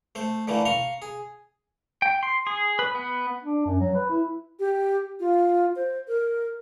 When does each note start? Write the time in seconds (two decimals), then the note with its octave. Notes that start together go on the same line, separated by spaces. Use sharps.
0.15 A3 C5
0.48 D3 E3 A3 A#3
0.65 F5 A#5 C6 C#6
1.02 G#4
2.02 G5
2.23 C6
2.47 G#4
2.79 B4
2.95 B3
3.43 D4
3.66 F#2
3.80 F#3
3.94 B4
4.10 E4
4.59 G4
5.20 F4
5.76 C5
6.08 A#4